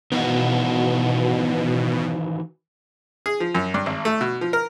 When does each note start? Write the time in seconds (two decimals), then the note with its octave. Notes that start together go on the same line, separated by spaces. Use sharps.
0.12 B2 D#3 E3 F#4
3.26 G#4
3.40 F3
3.55 F#2
3.74 G2
3.86 G#1
4.05 A3
4.21 B2
4.41 F3
4.53 A#4